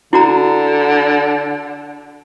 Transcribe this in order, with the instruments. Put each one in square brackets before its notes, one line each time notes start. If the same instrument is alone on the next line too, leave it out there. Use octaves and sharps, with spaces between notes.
[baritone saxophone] D3 [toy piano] E4 F#4 A#5